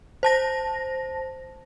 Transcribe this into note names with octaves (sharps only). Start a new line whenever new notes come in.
C5 A5 A#6